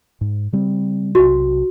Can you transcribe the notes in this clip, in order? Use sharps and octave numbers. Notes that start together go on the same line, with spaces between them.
G#2
C#3 G3 C4
B1 C3 F#4